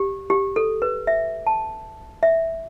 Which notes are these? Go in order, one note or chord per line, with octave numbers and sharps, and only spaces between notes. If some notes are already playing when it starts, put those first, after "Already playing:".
Already playing: G4
G4
A4
B4
E5
A5
E5